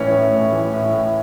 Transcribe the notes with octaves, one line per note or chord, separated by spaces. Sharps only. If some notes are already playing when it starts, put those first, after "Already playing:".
Already playing: A2 E3 C#4
A2
A2
E3
A2
A2